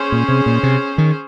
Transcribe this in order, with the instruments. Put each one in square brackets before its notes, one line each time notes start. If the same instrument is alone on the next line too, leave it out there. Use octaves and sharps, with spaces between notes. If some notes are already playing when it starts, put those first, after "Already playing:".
Already playing: [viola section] C#4 G#4 C5
[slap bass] A#2
C3
A#2
C3
D#3